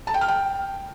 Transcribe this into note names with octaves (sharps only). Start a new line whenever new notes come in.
A5
G5
F6
G5